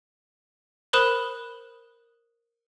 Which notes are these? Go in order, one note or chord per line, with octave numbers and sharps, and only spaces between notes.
A#4 C5 B5 D#6 F#6 E7